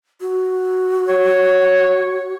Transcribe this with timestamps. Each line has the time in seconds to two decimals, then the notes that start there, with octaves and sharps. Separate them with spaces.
0.21 F#4
1.09 C#5